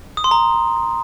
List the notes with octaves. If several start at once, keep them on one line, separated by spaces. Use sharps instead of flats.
D#6
C6
A#5